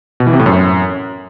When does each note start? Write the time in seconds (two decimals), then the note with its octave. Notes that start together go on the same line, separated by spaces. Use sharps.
0.20 B2
0.27 E3
0.33 C3
0.39 A2
0.46 F#2